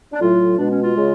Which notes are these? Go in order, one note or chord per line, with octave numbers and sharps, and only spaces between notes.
D4
A2 F#3 F4
B2 G#3 D4
C#4
F4
C#3 G#3